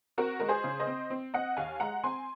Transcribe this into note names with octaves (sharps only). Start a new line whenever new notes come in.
C4 F#4 A#4
G#3 A#4
G#4 C5
C#3
C5 D#5
C4
C4
C4 D#5 F#5
D#2 F5 G#5
G#3 F#5 A#5
C4 G#5 C6